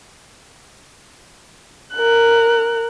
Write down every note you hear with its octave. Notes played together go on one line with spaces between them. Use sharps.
A#4 F#6